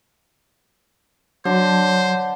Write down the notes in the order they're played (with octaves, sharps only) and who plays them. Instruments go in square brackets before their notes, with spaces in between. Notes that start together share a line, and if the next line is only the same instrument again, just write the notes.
[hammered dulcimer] D3 [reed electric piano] F#3 [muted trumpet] C5 [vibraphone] C#5